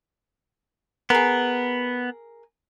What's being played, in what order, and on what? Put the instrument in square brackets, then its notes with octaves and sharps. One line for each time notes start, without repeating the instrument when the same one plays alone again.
[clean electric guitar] B3 [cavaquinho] G#4 A#4